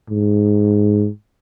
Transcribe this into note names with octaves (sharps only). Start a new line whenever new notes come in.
G#2